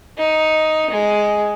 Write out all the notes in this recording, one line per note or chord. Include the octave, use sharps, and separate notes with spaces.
D#4
G#3